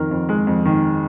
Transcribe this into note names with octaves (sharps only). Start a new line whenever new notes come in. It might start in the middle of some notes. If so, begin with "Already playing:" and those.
Already playing: F2 D#3 A#4
F2
G#3
F2
D#3